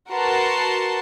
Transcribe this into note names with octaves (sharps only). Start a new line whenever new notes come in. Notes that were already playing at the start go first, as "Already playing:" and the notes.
F#4 A#4 B4 F#5 A5 C6